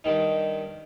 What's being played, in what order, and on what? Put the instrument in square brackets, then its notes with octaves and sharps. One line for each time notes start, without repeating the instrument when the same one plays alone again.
[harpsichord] G2 D#3 D#4